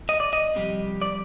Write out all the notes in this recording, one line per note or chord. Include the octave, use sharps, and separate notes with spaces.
D#5
D5
D#5
F2 C3 G3
D5